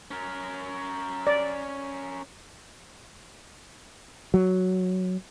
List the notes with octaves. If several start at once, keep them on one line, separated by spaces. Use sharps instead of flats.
C#4 A#4
D5
F#3